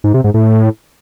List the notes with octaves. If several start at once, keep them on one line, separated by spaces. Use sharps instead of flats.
G#2
C3
G#2
A2